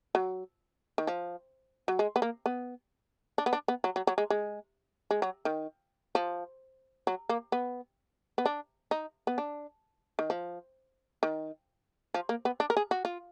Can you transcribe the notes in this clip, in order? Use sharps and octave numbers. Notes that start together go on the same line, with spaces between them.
F#3
D#3
F3
F#3
G#3
B3
A#3
B3
D4
B3
D4
B3
F#3
F#3
F#3
G#3
G#3
G#3
F#3
D#3
F3
F#3
A#3
B3
B3
D4
D#4
B3
D4
D#3
F3
D#3
F3
A#3
B3
D4
A#4
G#4
F#4
F4